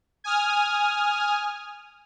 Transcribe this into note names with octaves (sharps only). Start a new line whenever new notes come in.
G#5 D#6 F6